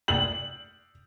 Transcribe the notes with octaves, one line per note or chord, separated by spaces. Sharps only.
F#7